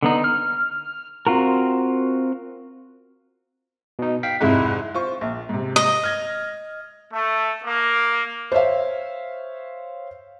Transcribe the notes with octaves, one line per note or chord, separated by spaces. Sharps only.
D3 B3 D#4
F6
C4 F4 F#4 A#4
B2 D#4
F5 G5 B6
C2 F2 G#2 D#4 E4
F4 C5 C#6
A#1
G#2 C3
D#5
F6 G#6 A#6
A3
A#3
C5 C#5 E5 F5